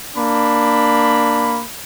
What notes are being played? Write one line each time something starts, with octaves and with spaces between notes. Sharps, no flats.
A#3 D4 B5